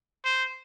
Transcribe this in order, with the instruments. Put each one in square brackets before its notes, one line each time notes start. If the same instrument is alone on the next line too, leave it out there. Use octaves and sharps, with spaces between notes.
[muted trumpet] C5